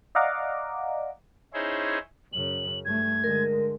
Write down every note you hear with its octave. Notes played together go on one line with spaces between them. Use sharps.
D5 D#5 F5 F#5 A#5 D6
C#4 D#4 E4 G#4 C5 C#5
F#2 C#3 F#7
G2 A3 G#6
D3 G#3 A#4